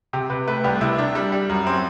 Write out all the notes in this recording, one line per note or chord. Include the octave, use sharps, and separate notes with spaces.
C3 G4
C3 B4
A3 B4
C2 G4
C3 E4
D4
G3
G3
F#2
C4